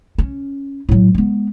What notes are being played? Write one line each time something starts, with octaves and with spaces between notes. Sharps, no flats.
C#4
A2 F#3
G#3 B3